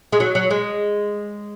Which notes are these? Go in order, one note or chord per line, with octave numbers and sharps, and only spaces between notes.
G#3
F#3
F#3
G#3